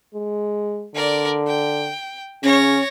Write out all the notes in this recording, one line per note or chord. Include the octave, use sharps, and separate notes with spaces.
G#3
D3 A#4 D5
G5
C#3 C#4 C#5 A#6